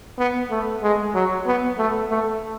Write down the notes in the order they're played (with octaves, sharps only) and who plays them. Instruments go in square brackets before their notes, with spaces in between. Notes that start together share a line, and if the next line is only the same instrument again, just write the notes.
[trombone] B3
A3
G#3
F#3
B3
A3
A3